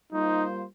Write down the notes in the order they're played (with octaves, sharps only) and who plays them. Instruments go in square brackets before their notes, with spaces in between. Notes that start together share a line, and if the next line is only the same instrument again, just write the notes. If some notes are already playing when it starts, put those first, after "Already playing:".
[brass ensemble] G3 A#3 F4 C5 [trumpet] D#4